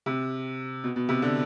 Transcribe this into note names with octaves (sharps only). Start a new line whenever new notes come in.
C3
B2
B2
C3
D3